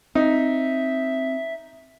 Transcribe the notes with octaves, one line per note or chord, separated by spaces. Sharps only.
C4 D#4 E5